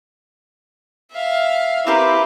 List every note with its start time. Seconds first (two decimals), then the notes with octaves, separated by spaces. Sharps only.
1.12 E5 F5
1.87 C4 E4 G4 A#4 B4 D6